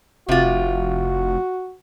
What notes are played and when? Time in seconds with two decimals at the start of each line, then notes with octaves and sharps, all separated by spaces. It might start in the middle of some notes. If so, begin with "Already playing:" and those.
0.29 F1 C3 F4 F#4